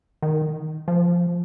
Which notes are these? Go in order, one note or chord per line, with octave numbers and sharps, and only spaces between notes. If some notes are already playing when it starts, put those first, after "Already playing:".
D#3
F3